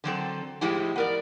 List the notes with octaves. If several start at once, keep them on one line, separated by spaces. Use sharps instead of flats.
D3 F#3 C4 A4
A2 F3 G#3 E4 G4
B3 A#4 D5